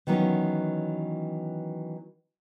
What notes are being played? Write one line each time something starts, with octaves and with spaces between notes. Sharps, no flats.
D#3 E3 F#3 B3 C#4